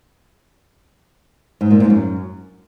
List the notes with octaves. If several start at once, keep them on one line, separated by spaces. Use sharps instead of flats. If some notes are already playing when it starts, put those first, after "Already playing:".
G#2
A#2
G#2
F#2